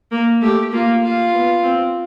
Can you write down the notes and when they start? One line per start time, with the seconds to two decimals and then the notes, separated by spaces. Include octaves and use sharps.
0.11 A#3
0.41 A3 G4
0.72 A#3 F4
1.02 F4
1.33 B3
1.63 C4